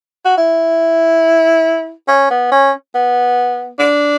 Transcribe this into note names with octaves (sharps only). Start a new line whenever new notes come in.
F#4
E4
C#4
B3
C#4
B3
D4